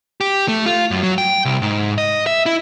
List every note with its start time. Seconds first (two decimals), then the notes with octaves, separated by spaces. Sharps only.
0.21 G4
0.48 A3
0.66 F4
0.91 F#2
1.03 F#3
1.18 G5
1.45 C2
1.62 G#2
1.98 D#5
2.26 E5
2.46 E4